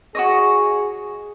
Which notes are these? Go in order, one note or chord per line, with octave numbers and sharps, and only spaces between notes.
F#4 G#4 C#5 D#5